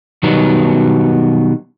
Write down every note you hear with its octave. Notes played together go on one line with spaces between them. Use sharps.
B2 D#3 F#3 G3 B3